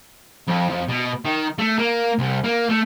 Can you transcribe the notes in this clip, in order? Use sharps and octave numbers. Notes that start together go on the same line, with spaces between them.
F2
F2
B2
D#3
A3
A#3
C2
A#3
A3